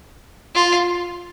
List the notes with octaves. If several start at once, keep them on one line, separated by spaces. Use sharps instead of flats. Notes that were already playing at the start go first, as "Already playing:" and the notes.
F4